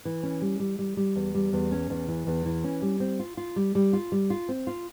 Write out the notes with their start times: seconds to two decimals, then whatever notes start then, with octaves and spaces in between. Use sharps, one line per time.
0.05 E3
0.23 C#4
0.42 G3
0.60 G3
0.79 G3
0.97 G3
1.16 E2
1.35 G3
1.53 E2
1.72 C#4
1.90 E2
2.08 E3
2.27 E2
2.46 E3
2.64 C#4
2.82 G3
3.00 C4
3.20 F4
3.37 F4
3.56 G3
3.75 G3
3.93 F4
4.12 G3
4.30 F4
4.49 C4
4.67 F4